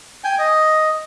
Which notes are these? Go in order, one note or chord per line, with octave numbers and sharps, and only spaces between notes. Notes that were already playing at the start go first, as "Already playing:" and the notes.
G5 G#5
D#5